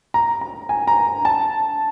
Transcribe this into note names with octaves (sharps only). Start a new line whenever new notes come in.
A#5
A#5
G#5
A#5
A5